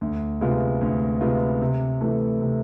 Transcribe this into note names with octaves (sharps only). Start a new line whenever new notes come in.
D2
C3 G#3 B3 F4
D2
C3 G#3 B3 F4
C3
E3 A3
C3